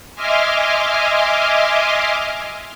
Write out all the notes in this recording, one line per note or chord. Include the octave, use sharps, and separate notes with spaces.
D#5 E5 G#5 C6 D6 F6